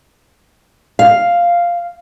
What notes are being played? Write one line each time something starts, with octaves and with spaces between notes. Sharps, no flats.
F5